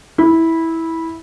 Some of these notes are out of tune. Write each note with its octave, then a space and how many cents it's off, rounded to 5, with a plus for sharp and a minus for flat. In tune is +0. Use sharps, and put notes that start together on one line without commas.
E4 -15